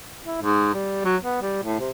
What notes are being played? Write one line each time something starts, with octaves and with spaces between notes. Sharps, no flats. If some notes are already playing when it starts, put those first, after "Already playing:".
E4
G#2
G3
F#3
B3
G3
A2
C3